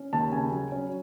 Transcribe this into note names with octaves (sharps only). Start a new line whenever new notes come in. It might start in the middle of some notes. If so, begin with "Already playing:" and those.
Already playing: C#4
D#2 A5
C#3 G#5
F#3
C#4